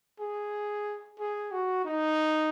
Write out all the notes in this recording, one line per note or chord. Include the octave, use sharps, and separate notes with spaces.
G#4
G#4
F#4
D#4